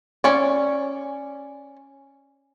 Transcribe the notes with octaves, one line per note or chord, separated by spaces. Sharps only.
C#4 D5